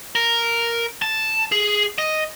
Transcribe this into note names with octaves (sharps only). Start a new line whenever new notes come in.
A#4
A5
G#4
D#5